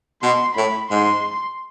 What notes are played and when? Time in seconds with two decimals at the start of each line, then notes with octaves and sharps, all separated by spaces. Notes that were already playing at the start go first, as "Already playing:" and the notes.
0.22 B2 C6
0.56 A2 B5
0.90 G#2 C6